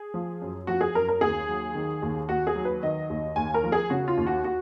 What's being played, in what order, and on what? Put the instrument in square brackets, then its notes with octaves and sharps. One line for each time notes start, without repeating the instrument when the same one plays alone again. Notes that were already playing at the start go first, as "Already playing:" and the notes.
Already playing: [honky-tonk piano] G#4
F3
F#2
F3 F#4
G#4
F#2 A#4
A#4
D#2 G#4
F#3
D#3
D#2
D#2 F#4
G#4
F#3
B4
D#3 D#5
D#2
D#2 G#5
A#4
F3
G#4
C#3 F#4
F4
D#2
F#4
F#4